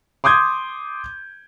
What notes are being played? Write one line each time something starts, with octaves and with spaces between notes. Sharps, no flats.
C6 D6 D#6 G6 G#6